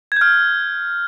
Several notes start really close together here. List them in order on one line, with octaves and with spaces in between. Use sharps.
G#6 G6 F6